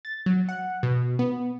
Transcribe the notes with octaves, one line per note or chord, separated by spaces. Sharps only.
A6
F#3
F#5
B2
B3